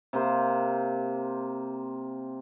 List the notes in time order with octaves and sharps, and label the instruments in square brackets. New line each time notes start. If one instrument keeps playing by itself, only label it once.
[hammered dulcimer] C3 A#3 C5